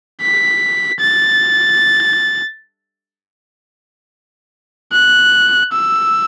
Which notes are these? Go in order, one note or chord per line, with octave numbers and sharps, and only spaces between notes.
B6
A6
F#6
E6